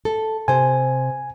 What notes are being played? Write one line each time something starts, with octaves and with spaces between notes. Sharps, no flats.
A4
C3 C5 G#5